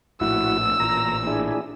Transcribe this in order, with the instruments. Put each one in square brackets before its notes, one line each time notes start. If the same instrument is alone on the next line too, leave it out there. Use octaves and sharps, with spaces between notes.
[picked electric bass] A#1 A2 [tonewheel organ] E4 F#4 [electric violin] E6
[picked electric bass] A1 A#2 [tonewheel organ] A#5
[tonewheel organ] D4 E4 G#4